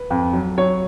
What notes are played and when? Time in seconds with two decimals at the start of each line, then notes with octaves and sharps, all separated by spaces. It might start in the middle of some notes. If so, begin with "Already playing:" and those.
Already playing: B4
0.10 F2
0.33 F#3
0.58 F#3 C#5